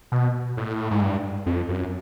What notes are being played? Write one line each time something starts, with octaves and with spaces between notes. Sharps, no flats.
B2
A2
G#2
G2
F2
F#2